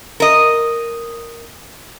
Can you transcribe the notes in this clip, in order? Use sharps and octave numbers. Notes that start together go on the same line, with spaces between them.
A#4 D#5